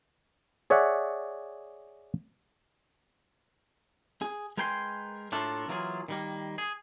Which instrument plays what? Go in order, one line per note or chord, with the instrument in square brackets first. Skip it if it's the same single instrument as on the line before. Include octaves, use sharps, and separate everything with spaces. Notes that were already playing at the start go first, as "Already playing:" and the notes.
[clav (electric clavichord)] G#4 C#5 D5 E5 F#5
[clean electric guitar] G#4
G#3 A#4 B4 G5 G#5 C6
A2 A3 A#3 D4 F4 A4
E3 F#3 A#3 F4 G#4
D#3 G3 A#3
G#4